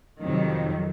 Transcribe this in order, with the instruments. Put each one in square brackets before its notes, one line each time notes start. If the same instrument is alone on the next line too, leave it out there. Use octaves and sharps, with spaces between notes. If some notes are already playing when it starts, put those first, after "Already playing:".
[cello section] F2 C3 D#3 F#3